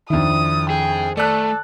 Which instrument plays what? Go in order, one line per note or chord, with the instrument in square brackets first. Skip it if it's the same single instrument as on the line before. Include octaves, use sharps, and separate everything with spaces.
[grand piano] F2 D4 E4 [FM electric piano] D#3 [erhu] D#6
[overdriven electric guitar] G#4 [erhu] G5
[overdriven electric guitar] A3 [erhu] A4 [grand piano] D5 F#6